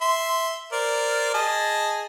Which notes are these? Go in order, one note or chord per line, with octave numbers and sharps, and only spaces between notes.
E5 C6
A#4 C5 D5
G#4 D#5 A5